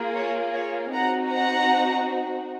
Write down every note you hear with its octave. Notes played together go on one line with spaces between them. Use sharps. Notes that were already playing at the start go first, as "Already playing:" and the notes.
Already playing: A#3 F4 G#4
C#5
C#5
C4 D#4 F#4 F#5 A#5
F#5 A#5